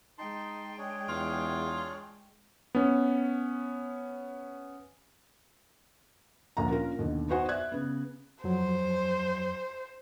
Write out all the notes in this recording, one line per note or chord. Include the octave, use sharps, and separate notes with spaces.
G#3 D#4 G5 A5 C6
D4 G#4 C#5
E2 F4
B3 C#4
D2 A#2 F3 D4 A#5
A#3 C#4 D4 F4 A#4
D#2 B2 D3 D#3
B3 D#4 F#4 C5 F#5 G#5
D5 E5 F#6 G#6
C#3 B3
F2 F#3 C5